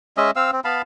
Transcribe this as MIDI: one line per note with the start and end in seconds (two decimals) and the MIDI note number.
0.17 0.31 56
0.17 0.31 61
0.17 0.31 75
0.17 0.31 76
0.36 0.51 60
0.36 0.51 77
0.36 0.51 88
0.52 0.60 60
0.65 0.82 59
0.65 0.82 77
0.65 0.82 81
0.65 0.82 83